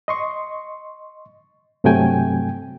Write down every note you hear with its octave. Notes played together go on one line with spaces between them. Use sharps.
D#5 C6 C#6
G2 C3 F#3 A3 G5 G#5